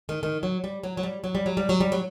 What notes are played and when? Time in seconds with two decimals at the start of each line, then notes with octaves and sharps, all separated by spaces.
0.09 D#3
0.23 D#3
0.43 F#3
0.64 G3
0.83 F#3
0.97 F#3
1.03 G3
1.24 F#3
1.35 G3
1.46 F#3
1.57 G3
1.69 F#3
1.80 G3
1.92 F#3